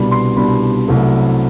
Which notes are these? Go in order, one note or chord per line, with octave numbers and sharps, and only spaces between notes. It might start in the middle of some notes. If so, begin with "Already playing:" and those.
Already playing: C2 B2 G3 B3 D4 B5
C6
C2 B2 G3 B3 D4 B5
C2 C3 F#3 A3